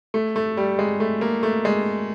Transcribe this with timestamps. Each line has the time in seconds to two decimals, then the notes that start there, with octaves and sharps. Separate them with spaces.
0.14 A3
0.36 A3
0.57 G3
0.79 G#3
1.00 A3
1.21 A#3
1.43 A3
1.65 G#3